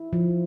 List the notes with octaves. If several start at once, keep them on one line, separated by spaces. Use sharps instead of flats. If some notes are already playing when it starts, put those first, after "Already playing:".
Already playing: E4
F3